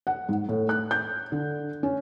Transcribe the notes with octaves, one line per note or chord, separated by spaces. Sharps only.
F#5
G#2
A2
F#6
G6
D3
C#4